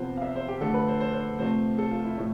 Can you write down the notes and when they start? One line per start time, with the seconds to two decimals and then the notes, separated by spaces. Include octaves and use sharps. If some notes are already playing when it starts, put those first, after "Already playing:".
Already playing: C3 F3 B3 C5
0.17 F5
0.22 E5
0.36 C5
0.48 G4
0.61 D3 F3 A3 A4
0.74 B4
0.88 C5
1.00 C5
1.13 C5
1.39 C3 F3 A3 C5
1.78 A4
1.91 F4
2.04 E4
2.17 A2 F3 A3